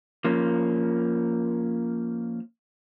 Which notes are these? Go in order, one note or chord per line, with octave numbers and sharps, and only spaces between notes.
F3 A#3 C#4